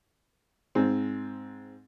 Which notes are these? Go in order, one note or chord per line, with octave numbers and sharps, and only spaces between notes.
G#2 C4